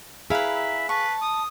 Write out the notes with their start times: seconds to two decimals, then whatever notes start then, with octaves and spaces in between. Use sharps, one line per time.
0.30 E4 G#4 B4 F5 A#5
0.55 E5
0.89 B4 A5 C#6
1.22 D#6